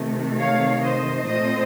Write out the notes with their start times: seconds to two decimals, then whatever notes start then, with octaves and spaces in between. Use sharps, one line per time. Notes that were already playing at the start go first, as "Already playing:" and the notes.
Already playing: C3 D#3 A3
0.39 C#5 F5
0.82 C5 D#5
1.26 A#2 A3 C4 C5 D#5